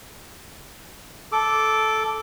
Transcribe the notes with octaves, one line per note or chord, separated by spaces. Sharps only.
A4 D6